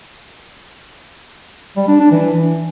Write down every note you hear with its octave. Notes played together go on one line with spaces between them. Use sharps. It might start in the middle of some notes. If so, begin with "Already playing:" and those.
G3
D4
D4
E3